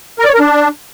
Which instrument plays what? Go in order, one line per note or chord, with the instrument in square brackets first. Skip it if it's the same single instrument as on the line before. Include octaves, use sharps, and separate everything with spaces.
[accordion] A#4
D5
C#5
A#4
D4